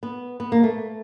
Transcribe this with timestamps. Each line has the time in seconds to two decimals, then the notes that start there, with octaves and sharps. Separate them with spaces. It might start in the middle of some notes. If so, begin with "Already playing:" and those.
0.03 B3
0.40 B3
0.52 A#3
0.64 A3